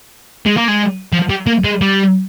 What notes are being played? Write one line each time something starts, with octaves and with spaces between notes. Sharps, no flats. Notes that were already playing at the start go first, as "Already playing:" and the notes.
G#3
A#3
G#3
F3
G3
A#3
G#3
G3